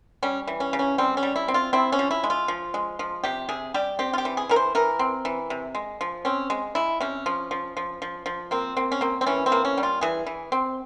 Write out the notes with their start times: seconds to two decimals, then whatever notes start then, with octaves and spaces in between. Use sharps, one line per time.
0.23 G3 C#4
0.47 E3
0.60 C#4
0.73 C#3
0.79 C#4
0.98 G3 C4
1.17 C#4
1.23 G3
1.36 E4
1.48 C4
1.54 F4
1.73 C4 E4
1.92 C#4
1.99 F3
2.11 E4
2.24 G#3
2.30 F4
2.48 F3
2.74 G#3
2.99 F3
3.24 C3 G4
3.49 C3 G#4
3.74 G3 G4
3.99 C4 G4
4.13 F4
4.18 G4
4.25 E3
4.37 G#4
4.49 E3 A#4
4.56 C5
4.75 E3 A#4
4.99 C4
5.25 E3
5.50 C3
5.75 G#3
6.01 F3
6.25 C4 C#4
6.50 G#3
6.75 G#3 E4
7.01 C3 C#4
7.26 F3
7.51 F3
7.77 F3
8.02 F3
8.26 F3
8.51 A#3 C4
8.77 A#3 C4
8.92 C#4
9.01 A#3 C4
9.21 C4
9.27 E3 C#4
9.46 C4
9.52 A#3
9.65 C#4
9.77 G3
9.83 F4
10.01 E3 G#4
10.26 E3
10.52 C4